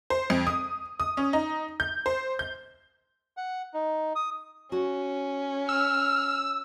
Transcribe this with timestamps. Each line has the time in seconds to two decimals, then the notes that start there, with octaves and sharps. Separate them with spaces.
0.10 C5
0.30 F2
0.47 D#6
1.00 D#6
1.17 C#4
1.33 D#4
1.80 G6
2.06 C5
2.39 G6
3.37 F#5
3.74 D#4
4.15 D#6
4.72 C#4 F#4 G#5
5.69 E6 F6